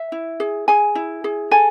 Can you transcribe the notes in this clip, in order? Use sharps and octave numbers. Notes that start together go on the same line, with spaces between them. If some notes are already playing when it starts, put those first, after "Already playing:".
Already playing: E5
E4
G#4
G#4 G#5
E4
G#4
A4 G#5